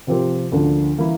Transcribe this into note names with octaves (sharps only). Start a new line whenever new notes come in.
C3 F3 C4 G4 A#4
D2 D3 F3 A#3 D4
E3 A#3 E4